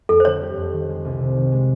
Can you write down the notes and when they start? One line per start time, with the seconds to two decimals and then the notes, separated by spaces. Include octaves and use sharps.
0.09 F2 A4
0.20 C5
0.25 D3 C#5
0.41 G3
0.57 F2
0.73 D#3
0.89 G#3
1.05 C2
1.19 C3
1.35 D#3
1.52 G#3